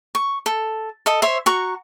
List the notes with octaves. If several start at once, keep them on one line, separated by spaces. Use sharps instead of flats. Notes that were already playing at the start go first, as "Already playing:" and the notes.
C#6
A4
A4 D#5
C5 C#5 E5
F#4 A#5 C#6